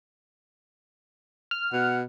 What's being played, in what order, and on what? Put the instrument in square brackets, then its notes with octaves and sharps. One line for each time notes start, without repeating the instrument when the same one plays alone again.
[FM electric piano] F6
[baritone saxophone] B2 [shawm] F#5